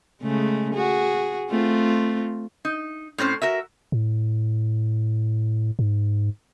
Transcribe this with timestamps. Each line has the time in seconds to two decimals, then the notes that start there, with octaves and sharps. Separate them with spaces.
0.22 C#3 G#3 A3
0.73 F#4 G#4
1.50 A3 C4 F4
2.65 D#4
3.18 A2 C4 C#4 C5
3.42 F#4 A#4 E5
3.92 A2
5.79 G#2